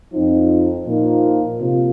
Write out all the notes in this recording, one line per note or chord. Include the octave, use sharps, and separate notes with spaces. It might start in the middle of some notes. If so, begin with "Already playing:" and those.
F2 F3 C4 D#4
A#2 F3 A#3 D#4
C3 F3 A#3 F4